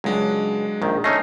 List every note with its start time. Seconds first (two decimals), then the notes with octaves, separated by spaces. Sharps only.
0.04 C#2 F#3 G#3 D4
0.82 A#1 D#3
1.04 A3 C#4 D#4 D#5 A#6 C7